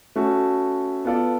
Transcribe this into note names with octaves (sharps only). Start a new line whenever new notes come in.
A3 C#4 F#4 A4
B3 F4 A4 D5